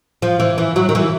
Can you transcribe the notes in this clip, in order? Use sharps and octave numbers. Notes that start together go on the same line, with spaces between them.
F3
E3
E3
F#3
D#3
E3